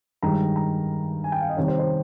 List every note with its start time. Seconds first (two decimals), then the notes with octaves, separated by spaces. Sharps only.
0.23 G2 D#3 G#3 A#5
0.56 A#5
1.24 G#5
1.32 G5
1.41 F5
1.49 D#5
1.57 C3 D#3 G3 C#5
1.68 C5
1.79 C5